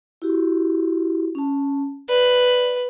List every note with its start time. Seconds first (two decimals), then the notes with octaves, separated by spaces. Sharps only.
0.22 E4 F#4 G4
1.35 C#4 A5
2.09 B4 D5